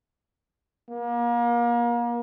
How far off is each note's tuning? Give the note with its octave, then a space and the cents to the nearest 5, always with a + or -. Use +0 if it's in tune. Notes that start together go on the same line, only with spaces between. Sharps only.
A#3 +30